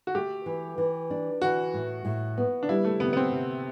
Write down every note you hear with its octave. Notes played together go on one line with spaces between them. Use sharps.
F#4
A3 G4
E3
E3
D4
E3 F#4
A2
A2
B3
D4
G3 E4
A3
C3 B3
B3
C4
C3